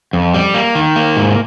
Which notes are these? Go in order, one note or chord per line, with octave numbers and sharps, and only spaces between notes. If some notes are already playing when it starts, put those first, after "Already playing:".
F2
G3
A#3
D#3
A#3
G#2